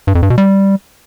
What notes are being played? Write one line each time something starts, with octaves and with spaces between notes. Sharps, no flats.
G2
F2
G2
B2
G3